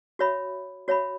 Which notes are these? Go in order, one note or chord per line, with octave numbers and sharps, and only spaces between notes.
F#4 C#5 E5 B5
F#4 C#5 E5 B5